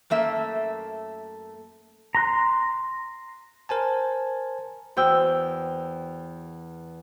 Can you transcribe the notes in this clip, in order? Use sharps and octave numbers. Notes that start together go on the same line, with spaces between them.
F#2 A3 A#3 E5
A#5 C6 F#6
A#4 C5 G#5 A5
E2 F#4 C5 G5 E6